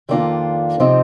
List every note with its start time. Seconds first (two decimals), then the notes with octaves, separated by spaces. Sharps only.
0.09 F2 D#3 A#3 D4 F4
0.80 C3 F3 C4 D#4